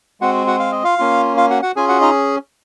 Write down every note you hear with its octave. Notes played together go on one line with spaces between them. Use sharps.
G#3 C4 F#4 F#5
F#4 F#5
F5
D#5
F4 F5
A#3 C#4 F4
F4 F5
F#4 F#5
F#4 F#5
C#4 F4 G#4 G#5
F#4 F#5
D#4 D#5